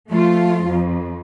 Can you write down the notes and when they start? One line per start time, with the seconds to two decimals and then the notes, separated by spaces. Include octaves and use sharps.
0.10 F3 A3 F4
0.67 F2